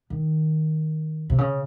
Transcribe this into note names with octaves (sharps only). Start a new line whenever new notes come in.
D#3
C3
C#3